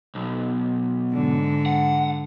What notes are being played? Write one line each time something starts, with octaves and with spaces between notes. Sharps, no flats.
B1
G#2 D3
F#5